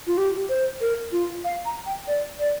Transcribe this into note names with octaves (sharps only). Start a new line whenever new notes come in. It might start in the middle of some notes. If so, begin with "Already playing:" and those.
F4
G4
C5
A#4
F4
F5
A#5
G5
D5
D5